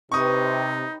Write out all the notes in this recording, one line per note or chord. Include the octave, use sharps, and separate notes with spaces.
C3 D#4 G4 B4 C#5 C#6 D#6